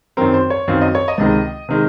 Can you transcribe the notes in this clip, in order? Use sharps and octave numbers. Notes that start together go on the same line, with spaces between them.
F#2 D#3 F#3 C4 A#4
C5
C#5
F#2 D#3 F#3 C4 F5
D#5
C#5
D#5
C#2 C3 D#3 G#3
C3 D#3 G#3